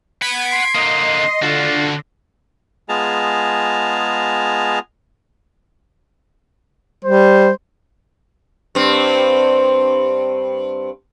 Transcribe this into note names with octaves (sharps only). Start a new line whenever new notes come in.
F#5 B5 G#6 B6 D7
C6
D3 A#3 D#5
D3 D4 F4 F#4
G#3 B3 F4 G#4 A5 A#5
G3 C5
G2 C4